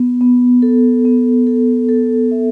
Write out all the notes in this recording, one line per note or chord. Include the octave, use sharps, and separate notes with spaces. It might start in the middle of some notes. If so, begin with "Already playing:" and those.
Already playing: B3
B3
A4
B3
A4
A4
E5